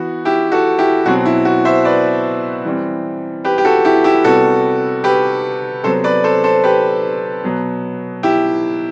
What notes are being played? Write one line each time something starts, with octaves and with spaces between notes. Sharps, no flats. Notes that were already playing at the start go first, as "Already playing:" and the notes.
Already playing: E3 B3 F#4
E4 G4
F#4 A4
E4 G4
B2 F#3 C4 F#4
E4
F#4
C5 E5
B4 D5
E3 G3 C4
G4 B4
G4
F#4 A4
E4 G4
E4 G4
C3 G3 B3 F#4 A4
G4 B4
C3 F#3 B3 A4 C5
B4 D5
A4 C5
A4 C5
G4 B4
B2 F#3 B3
E4 G4